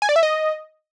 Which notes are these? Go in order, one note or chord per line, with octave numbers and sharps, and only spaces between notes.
G#5
D5
E5
D#5